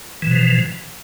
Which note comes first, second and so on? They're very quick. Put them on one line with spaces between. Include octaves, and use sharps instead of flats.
E3 B2 F3